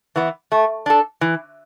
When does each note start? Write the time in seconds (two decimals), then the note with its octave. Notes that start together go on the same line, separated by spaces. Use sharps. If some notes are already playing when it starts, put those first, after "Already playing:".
0.16 E3 B3
0.52 A3
0.86 D4 A4
1.21 E3